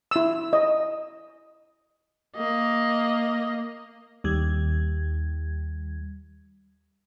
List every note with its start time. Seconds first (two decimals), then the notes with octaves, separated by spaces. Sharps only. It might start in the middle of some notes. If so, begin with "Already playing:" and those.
0.11 E4 E6
0.53 D#5
2.36 A#3 D#5
4.24 D#2 G3 G#6